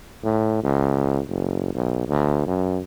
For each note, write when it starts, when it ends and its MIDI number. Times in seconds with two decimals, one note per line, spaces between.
0.24 0.59 45
0.63 1.20 37
1.28 1.73 30
1.74 2.07 35
2.08 2.46 38
2.47 2.82 42